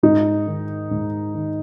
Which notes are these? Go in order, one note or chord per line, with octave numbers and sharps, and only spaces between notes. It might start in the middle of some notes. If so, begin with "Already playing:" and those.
G#2 D#4
D#3
G#2
D#3